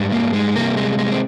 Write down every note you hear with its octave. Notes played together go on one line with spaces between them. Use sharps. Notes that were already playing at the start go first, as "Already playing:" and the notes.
Already playing: G#2 G3
A#3
G#3
C3 G3 A#3
G#3
G#3
C4